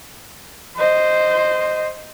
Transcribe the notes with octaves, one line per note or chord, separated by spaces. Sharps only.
C5 D#5